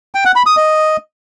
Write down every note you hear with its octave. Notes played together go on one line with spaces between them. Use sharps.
G5
F#5
B5
D#6
D#5